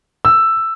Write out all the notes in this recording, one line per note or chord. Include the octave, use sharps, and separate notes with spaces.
E6